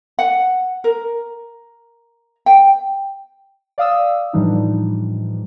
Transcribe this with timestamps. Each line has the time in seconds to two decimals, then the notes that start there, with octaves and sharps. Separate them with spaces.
0.19 F#5
0.84 A#4
2.46 G5
3.78 D5 F5 D#6 E6
4.33 A2 E3 F3 G3 D4 D#4